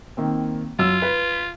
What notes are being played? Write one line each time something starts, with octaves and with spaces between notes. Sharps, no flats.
D#3 A#3 C4
F#2 F#3 F4 E6
B4